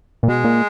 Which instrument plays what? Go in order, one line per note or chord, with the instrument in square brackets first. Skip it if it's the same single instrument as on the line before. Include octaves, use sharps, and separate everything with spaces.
[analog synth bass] A#2
[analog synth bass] B2 [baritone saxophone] G#3
[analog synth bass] A#2